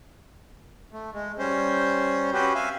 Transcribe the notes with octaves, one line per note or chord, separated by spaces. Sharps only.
A3
G#3
G3 C#4 C5
C4 C#4 F#4 G4 B4 C5
E5 F5 G#5